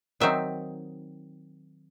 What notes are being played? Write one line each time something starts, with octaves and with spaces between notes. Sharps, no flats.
D#3 F#3 C4 D#4 E5